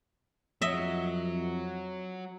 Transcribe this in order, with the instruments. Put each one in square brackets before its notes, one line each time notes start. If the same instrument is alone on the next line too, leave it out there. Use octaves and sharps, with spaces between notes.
[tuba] F2 [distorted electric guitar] F#3 [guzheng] D#5 E5